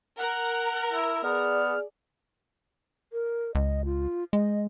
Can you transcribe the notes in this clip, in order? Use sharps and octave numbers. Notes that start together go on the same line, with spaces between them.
A#4 F#5
E4
B3 G#4 D5 F6
A#4
C#2 D#5
F4
G#3 D#5